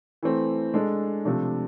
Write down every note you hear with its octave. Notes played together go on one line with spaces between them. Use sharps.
E3 A3 C4
G#3 D4 A4
C3 F3 A3 D4